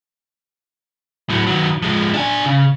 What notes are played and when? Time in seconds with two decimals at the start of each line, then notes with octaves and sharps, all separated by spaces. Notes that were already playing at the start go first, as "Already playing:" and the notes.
1.30 A2 F#3
1.46 D#3 F#3
1.82 F3 G#3
2.14 D4 G#5
2.45 C#3